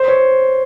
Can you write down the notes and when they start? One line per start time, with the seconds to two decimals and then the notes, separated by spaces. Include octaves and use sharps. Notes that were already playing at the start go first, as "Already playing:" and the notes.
Already playing: C5
0.08 C#5